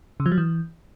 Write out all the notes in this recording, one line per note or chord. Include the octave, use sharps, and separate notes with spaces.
C#3
F3
F#3
E3